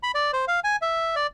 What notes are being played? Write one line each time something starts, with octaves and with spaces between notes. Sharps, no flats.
B5
D5
C5
F5
G#5
E5
D5